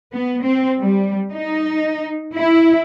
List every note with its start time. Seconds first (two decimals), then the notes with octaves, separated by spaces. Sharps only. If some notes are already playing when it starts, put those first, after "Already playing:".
0.14 B3
0.43 C4
0.80 G3
1.32 D#4
2.35 E4